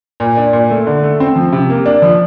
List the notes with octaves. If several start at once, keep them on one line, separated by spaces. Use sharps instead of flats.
A#2
D4
A#2
A3
D3
A3
C4
F3
C3
A#3
D4
F3